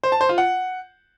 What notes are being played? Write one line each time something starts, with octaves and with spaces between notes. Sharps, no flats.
C5
A5
C5
F4
F#5